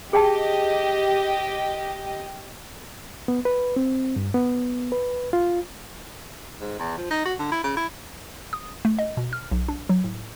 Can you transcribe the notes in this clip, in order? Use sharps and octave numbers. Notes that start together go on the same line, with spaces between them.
G4 G#4 D#5 G5 A5
B3
B4
C4
G2
B3
B4
F4
G#2
E2
F3
D#4
F#4
D3
E4
C#3
E4
D#6
A3
D#5
B2
F6
B1
D4
F#3
A2